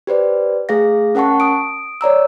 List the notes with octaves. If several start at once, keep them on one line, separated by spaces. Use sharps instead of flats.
G4 B4 C5 D5
A3 G#4 F5 A#6
C#4 A#4 F#5 A5 C#6
D#6 D7
C#5 D5 A#5 E6